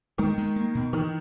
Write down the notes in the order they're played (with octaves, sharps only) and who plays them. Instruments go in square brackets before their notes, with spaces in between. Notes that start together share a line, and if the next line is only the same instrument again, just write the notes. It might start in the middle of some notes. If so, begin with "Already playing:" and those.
[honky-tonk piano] D#3 [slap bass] G#3
[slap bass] G#3
A#3
B2
[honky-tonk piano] D#3 [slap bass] E3